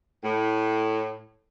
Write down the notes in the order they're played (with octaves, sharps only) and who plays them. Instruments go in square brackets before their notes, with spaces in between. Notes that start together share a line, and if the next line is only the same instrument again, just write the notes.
[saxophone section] A2